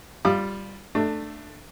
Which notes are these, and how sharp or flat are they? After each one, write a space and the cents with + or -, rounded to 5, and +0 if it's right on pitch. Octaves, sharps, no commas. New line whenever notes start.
G3 +0 F4 +0 D6 +40
A3 +0 D4 +20